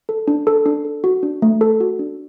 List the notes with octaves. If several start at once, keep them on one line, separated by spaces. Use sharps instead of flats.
A4
D4
A4
D4
A4
F#4
D4
A3
A4
F#4
D4